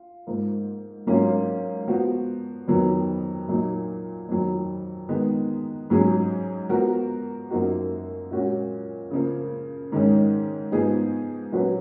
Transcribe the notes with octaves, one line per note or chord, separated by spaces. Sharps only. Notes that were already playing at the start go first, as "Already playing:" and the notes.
Already playing: F4
G#2 F3 A#3
G#2 F#3 A#3 C#4 F4
F3 B3 F#4
F2 D#3 F#3 B3
A#2 F#3 A#3 D#4
F2 D#3 F#3
D#3 G#3 B3
G#2 F#3 C#4 G#4
F3 B3 F#4 A#4
F#2 F3 A#3 D#4 F#4
A#2 G#3 C#4 F#4
C#3 F3 A#3
G#2 D#3 G#3 C#4
G#2 F3 B3 D#4 G#4
A#2 F#3 C#4 F#4 B4